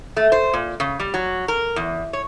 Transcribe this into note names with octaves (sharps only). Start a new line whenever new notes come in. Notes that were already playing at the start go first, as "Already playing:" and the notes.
A3
C5
A#2
C#3
G3
F#3
A#4
E2
C#5